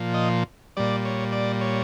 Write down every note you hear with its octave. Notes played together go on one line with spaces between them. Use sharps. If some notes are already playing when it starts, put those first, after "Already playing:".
Already playing: A#2 F3
D#5
A#2 G3 D5
C#5
D5
C#5